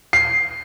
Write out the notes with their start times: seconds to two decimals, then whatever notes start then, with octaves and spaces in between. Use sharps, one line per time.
0.13 C7